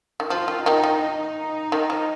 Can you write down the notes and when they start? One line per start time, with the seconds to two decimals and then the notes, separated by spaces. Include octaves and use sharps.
0.20 D#3
0.30 F3 F4
0.48 D#3
0.65 D#3 D#4
0.84 D#3
1.02 D#4
1.72 D#3
1.90 F3